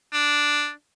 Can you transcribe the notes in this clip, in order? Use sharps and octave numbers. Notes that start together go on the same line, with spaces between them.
D4